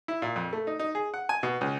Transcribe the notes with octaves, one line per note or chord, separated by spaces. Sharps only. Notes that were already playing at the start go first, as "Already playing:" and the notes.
E4
A#2
F2
A3
D#4
D#4
G#4
F#5
G#5
B2
C#2